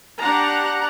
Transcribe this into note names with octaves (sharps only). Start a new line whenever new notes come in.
D4 G4 F#5 A#5